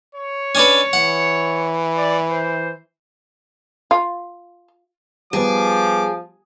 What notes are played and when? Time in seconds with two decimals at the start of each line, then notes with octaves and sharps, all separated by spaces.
0.15 C#5
0.55 C#4 D4 B4
0.93 E3 F#5
1.96 D5
2.30 C5
3.91 F4
5.33 F3 G3 B3 G#4 D6